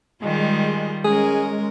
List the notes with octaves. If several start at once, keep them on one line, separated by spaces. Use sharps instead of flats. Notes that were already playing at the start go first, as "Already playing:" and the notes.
D#3 G3 G#3 F4
G#3 C#4 G#4 A#4